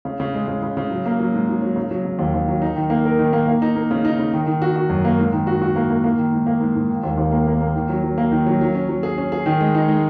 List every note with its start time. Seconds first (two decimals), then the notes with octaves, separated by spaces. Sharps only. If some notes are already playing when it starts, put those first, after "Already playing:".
0.05 C#3
0.20 C#3
0.34 G#3
0.48 C#3
0.63 C#3
0.77 C#3
0.91 F#3
1.06 A#3
1.20 F#3
1.34 G#2
1.48 F#3
1.62 F#3
1.76 C#3
1.91 F#3
2.05 C#3
2.19 D#2
2.34 D#2
2.48 F#3
2.62 D#4
2.76 D#3
2.90 A#3
3.05 A#4
3.19 D#3
3.33 A#3
3.47 A#3
3.62 D#4
3.76 A#3
3.91 C#3
4.05 D#4
4.19 C#3
4.34 D#3
4.47 D#3
4.62 F#4
4.76 F#4
4.89 F#2
5.05 A#3
5.19 G#2
5.33 D#3
5.47 F#4
5.61 F#4
5.76 A#3
5.90 A#3
6.04 A#3
6.18 D#3
6.32 G#2
6.46 A#3
6.60 G#2
6.75 G#2
6.90 D#3
7.04 D#2
7.18 D#2
7.32 A#3
7.47 A#3
7.61 A#3
7.76 D#3
7.89 F#3
8.04 F#3
8.18 A#3
8.31 D#3
8.46 F#3
8.61 F#3
8.75 C#4
8.89 F#3
9.03 G#4
9.18 C#4
9.32 G#4
9.46 D#3
9.61 G#3
9.75 D#4
9.88 G#3